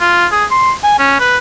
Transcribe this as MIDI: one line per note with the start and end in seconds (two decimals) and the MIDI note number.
0.01 0.27 65
0.32 0.45 68
0.51 0.72 84
0.84 0.98 80
0.99 1.19 61
1.20 1.38 71